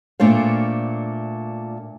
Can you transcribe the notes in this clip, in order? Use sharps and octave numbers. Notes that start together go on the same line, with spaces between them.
A#2 A3 D4 C5 F5